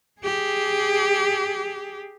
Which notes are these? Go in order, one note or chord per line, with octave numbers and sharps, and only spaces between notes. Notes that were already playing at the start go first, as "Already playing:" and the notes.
G4 G#4